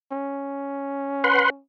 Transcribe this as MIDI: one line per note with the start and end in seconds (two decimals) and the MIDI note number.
0.12 1.61 61
1.24 1.50 71
1.24 1.50 78
1.24 1.50 84